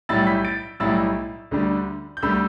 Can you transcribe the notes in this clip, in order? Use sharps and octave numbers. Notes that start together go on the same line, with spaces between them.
B1 A2 G3 E4 E6 A6
G6 B6
A6 D7
B1 A2 G3 E4 E6 A6
D2 D3 G3 D4
G6
D2 D3 G3 D4 B5 E6